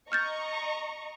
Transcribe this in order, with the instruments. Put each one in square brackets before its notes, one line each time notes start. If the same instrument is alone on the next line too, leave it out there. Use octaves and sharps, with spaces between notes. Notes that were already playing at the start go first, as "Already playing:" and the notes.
[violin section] D#5 A#5 C#6 [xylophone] F6 G6 A6